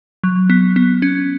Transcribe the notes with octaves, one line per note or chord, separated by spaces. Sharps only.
F#3
B3
B3
C#4